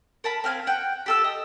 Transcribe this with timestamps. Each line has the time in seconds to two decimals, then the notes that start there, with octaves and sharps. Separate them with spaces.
0.24 A#4 A5 B5
0.44 C4 F5 G5 G#5
0.67 F#5 G5
1.06 G4 A4 E6
1.24 D#5